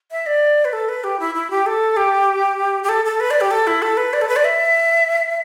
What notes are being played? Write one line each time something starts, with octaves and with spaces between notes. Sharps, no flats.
E5
D5
B4
A4
B4
G4
E4
E4
G4
A4
G4
G4
A4
A4
B4
D5
G4
A4
E4
A4
B4
D5
A4
B4
D5
E5